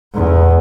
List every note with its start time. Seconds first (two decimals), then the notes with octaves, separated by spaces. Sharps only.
0.14 E2